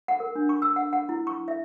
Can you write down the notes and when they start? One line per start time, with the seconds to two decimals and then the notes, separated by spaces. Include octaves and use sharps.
0.08 F#5
0.20 A#4
0.35 D4
0.49 C#6
0.62 E6
0.76 F#5
0.93 F#5
1.09 E4
1.27 C#6
1.48 E5